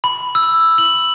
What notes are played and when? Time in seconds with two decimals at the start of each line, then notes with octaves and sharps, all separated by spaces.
0.04 B5
0.35 E6
0.78 F#7